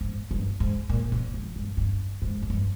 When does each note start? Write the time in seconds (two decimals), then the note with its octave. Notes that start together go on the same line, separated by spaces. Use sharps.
0.01 G#2
0.31 G2
0.60 G#2
0.89 A#2
1.12 C3
1.34 F2
1.56 G2
1.77 G2
2.22 G#2
2.42 F2
2.50 G2